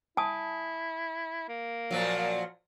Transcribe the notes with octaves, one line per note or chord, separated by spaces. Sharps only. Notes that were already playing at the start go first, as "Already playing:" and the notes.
E4 G#5 A5 D#6
A#3
A#2 F3 F#3